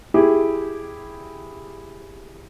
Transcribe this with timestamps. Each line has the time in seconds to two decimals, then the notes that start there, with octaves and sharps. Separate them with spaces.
0.14 E4 G4 G#4